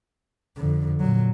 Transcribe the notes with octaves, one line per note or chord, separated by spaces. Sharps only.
F2 D3
A#2 F#3